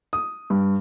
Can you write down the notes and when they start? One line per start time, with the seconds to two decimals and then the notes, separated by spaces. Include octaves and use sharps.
0.13 D#6
0.50 G2